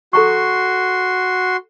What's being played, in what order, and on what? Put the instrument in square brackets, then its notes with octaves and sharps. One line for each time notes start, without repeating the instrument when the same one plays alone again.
[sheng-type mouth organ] F#4 C6 [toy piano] A4 A#5 C#6